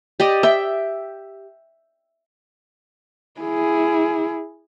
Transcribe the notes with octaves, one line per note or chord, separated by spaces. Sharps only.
G4 D5 D#5
E5 G5
E4 G#4